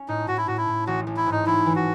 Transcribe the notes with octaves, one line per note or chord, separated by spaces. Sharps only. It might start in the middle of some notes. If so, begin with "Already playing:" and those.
Already playing: C#4
A2 D#4
A2 F#4
E4
A2 F#4
E4
A2
A1 F#4
A1
E4
G#2
D#4
A1 E4
E3
F#4